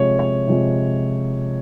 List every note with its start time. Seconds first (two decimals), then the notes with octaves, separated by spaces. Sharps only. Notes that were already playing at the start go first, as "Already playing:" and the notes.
Already playing: C3 F3 G#3 C#5
0.19 C#5
0.47 C3 F3 G#3